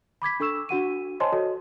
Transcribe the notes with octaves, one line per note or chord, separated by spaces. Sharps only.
B5 D6 G#6 B6
D4 A4 C#6 E6 E7
D4 F#4 F#5 D#7
C5 C#5 D#5 G#5 A5 C6
F#4 A4 C#5 D#5